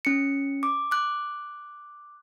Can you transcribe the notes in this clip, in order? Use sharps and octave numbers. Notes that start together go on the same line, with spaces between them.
C#4 C#7
D6
D6 F#6